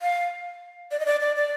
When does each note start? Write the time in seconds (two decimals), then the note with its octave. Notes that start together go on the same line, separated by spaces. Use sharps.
0.02 F5
0.91 D5
1.00 D#5
1.06 D5
1.21 D5
1.36 D5